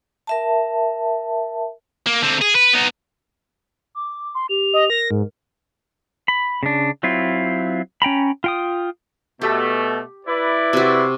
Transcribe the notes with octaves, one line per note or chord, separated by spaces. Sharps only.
A#4 E5 A5
A#3
D3 C4
G#4
B4
B3 D#4
D6
C6
G4 F7
D#5
A#4 A#6
G#2
B5
C#3 D4
F#3 C4 E4 F4
C#4 G5 A#5 B5
F4 G5 D#6
B2 A3 G4
E4 B4 D5
C3 F#4